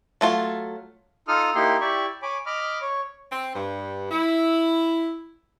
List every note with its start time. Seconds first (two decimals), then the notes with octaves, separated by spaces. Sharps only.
0.21 F#3 A3 F4
1.28 D#4 F4 A4 D#6 F6
1.55 A#3 D#4 E4 G4 C6
1.81 E4 G4 D5 E5 C#6
2.22 C#5 G#5 B5 D6
2.46 D#5 B5 D6 F6
2.81 C#5
3.32 C4
3.55 G2
4.11 E4